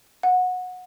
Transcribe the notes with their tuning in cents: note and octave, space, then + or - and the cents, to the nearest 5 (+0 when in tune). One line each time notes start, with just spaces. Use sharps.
F#5 -20